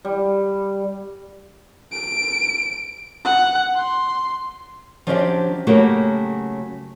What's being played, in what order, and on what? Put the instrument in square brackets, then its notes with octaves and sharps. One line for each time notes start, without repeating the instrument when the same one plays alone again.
[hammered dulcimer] G3
[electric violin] D7
F#5
C6
[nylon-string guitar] F3 F#3 C#4 D4 G4 E5
C#3 F#3 A3 A#3 F#4 G4